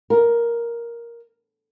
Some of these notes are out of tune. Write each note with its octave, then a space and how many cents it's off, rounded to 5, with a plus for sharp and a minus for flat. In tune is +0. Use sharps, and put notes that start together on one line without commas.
A#4 +5